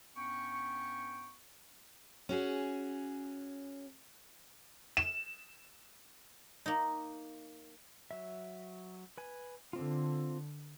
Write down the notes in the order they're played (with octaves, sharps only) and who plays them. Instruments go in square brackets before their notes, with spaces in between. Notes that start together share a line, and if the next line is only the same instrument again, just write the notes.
[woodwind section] G2 B3 C#4 G5 C#6
[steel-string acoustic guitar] C#4 F#4 G#4
[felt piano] E7
[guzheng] A#3 D#4
[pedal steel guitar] F#3 E5
B4 G#5
[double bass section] D3 [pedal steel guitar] C4 F4